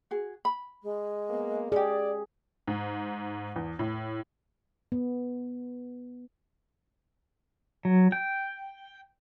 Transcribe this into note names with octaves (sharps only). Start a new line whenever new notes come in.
F#4 G#4
B5
G#3
A#3 B3
C#4 G4 G#4 D5
G#2
E2
A2
B3
F#3
G5